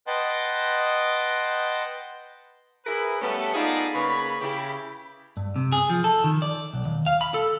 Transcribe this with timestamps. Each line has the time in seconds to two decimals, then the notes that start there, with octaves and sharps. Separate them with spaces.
0.07 B4 D#5 F#5 G5 A5 C6
2.86 E4 G#4 A#4 B4
3.21 G3 A3 B3 C#4 A4
3.54 B3 D#4 F4 G#4 A4 D5
3.94 C#3 A#3 B4 C#5 B5
4.41 C#3 E4 G4
5.37 G2
5.56 C3
5.72 G#4
5.90 F3
6.04 A4
6.24 D#3
6.42 D5
6.74 B1
6.85 D#2
7.06 F5
7.21 B5
7.34 A4